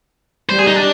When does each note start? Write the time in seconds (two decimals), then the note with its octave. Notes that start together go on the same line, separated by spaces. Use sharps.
0.49 G3 C5
0.59 G#4
0.67 D#4
0.76 D4